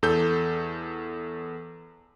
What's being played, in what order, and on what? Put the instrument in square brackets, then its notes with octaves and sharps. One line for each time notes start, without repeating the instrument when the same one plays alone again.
[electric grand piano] E2 A4 G6